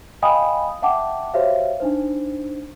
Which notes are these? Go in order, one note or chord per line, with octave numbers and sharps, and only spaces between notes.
D#5 F5 G5 G#5 B5 D#6
E5 F#5 G5 A5 D6
F#4 G4 C5 C#5 E5 F5
D4 D#4 C5